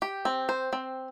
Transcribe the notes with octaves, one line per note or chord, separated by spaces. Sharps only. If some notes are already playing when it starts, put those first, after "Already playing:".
G4
C4
C5
C4